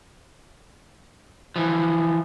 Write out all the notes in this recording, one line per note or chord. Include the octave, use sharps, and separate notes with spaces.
E3 F3